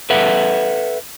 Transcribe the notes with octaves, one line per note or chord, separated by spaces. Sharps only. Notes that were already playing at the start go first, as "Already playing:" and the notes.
A4 B4 E5 F#5